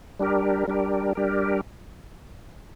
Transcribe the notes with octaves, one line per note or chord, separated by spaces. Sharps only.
G3 D4 G4 A#4
G3 D4 G4 A#4
G3 D4 G4 A#4